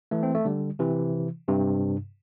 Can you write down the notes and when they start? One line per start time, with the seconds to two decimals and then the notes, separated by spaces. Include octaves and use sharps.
0.11 E3 A3
0.23 C4
0.34 A3
0.45 D3 G3
0.79 C3 E3
1.48 G2 C3